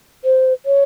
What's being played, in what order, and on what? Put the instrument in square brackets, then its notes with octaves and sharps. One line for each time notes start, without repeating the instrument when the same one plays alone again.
[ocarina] C5
C#5